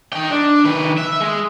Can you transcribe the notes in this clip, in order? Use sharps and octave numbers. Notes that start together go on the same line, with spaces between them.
D#4 G5
D4
D#3 B4
E5
G#3